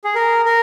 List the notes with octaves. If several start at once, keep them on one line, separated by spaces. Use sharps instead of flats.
G#4
A#4
A#4